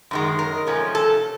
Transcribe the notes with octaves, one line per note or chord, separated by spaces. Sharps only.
F#2 D#3 G#3
A#4
C3 F3 A3 C#4
A4